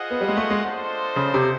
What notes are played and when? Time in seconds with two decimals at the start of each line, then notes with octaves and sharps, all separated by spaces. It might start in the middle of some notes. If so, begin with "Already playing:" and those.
Already playing: F4 G#4 C5 D#5 F#5
0.10 B3
0.21 G3
0.29 G#3
0.37 A3
0.50 G#3
0.63 D4 F4 A4 C5 D#5
1.16 C#3
1.34 C3